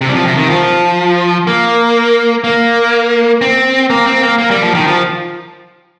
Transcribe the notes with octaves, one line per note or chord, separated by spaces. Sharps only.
C3
G3
F3
C3
D#3
F3
A#3
A#3
C4
A#3
C4
A#3
A#3
G3
F3
D#3
F3